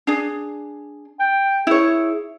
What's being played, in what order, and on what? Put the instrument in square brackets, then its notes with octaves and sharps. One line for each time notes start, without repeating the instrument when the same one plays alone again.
[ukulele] D4 G#4
[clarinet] G5
[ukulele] E4 C#5 [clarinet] G#4